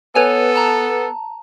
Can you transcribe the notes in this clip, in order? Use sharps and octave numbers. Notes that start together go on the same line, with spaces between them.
B3 A4 B4 C#5 G#5
A5 A#5